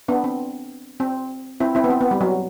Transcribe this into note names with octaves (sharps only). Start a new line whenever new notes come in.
B3 D4
C4
C4
C4 E4
C4 E4
B3
C4
B3
G3
F#3